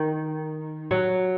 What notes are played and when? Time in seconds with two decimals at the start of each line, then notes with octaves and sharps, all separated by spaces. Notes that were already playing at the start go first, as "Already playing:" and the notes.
Already playing: D#3
0.91 F#3